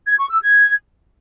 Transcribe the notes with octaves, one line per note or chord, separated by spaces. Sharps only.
G#6
C#6
E6
G#6